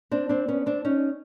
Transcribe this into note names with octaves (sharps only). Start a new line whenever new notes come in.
C4 D4
C4 D4
B3 C#4
C4 D4
C#4 D#4